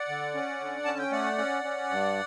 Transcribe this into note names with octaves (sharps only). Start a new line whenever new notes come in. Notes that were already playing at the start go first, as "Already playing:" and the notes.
Already playing: D5 F#5
D3
C#4
D3
C#4 A5
G5
A3 D5 F#5
C#4
C#4
G2